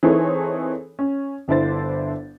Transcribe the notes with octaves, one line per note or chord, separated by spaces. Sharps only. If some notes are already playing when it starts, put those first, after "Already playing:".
E3 C4 D#4 G#4 A4 C#5
C#4
G1 D4 E4 C5 A6